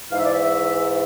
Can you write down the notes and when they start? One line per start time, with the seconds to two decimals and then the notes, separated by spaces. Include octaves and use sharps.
0.11 G#2 E3 F5
0.19 E5
0.25 D5
0.33 E5